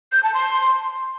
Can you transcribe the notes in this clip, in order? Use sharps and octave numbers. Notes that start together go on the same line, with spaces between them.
G6
A5
C6